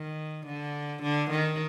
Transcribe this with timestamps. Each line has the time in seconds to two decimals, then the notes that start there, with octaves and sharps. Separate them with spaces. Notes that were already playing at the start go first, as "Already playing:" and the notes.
Already playing: D#3
0.46 D3
1.03 D3
1.31 D#3